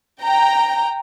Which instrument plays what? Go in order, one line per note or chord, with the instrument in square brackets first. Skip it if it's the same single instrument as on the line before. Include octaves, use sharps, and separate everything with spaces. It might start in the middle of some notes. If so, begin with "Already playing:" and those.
[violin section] G5 A#5